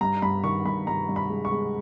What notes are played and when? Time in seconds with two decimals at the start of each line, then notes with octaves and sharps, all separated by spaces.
0.01 G2 A#5
0.22 G2 B5
0.44 D#3 C#6
0.65 G2 B5
0.87 G2 A#5
1.09 G2
1.16 B5
1.30 G#3
1.45 C#6
1.52 G#3